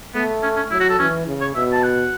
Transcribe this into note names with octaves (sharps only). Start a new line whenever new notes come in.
A3 B3
C#4
C#4
F#3 E4
F#4
A4
E3 C#4
C#3
C#5
B2 E5
A5
F#5